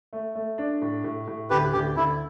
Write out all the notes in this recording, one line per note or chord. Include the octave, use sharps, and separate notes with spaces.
A3
A3
D4
A2
A2
A2
D2 G4 B4
D2 G4
D2 E4